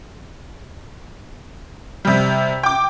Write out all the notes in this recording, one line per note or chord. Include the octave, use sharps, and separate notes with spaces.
C3 G3
G5 D6